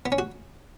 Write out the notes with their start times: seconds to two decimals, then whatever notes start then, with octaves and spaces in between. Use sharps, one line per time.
0.06 B3
0.12 C#4
0.18 F#4